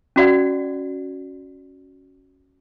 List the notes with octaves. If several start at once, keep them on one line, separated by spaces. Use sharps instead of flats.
C#4 F#4 D5 F#5